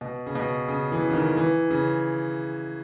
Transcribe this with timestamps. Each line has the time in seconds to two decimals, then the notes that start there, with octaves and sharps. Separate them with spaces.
0.01 B2
0.26 C#3
0.35 B2
0.68 C#3
0.92 E3
1.10 C#3
1.13 D#3
1.37 E3
1.70 C#3